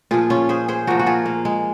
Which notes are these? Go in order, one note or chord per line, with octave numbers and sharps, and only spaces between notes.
A#2 F3 F4 G#4
C#4 F4
G#4 C5
G#4 C5
A#2 F3 F#4 A#4
F#4
F4 G#4
A#3
G#3